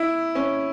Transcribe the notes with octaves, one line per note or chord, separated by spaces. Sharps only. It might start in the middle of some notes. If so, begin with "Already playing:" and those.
Already playing: E4
C#4